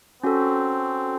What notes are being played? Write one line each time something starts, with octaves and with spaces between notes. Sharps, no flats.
C4 C#4 F#4 A4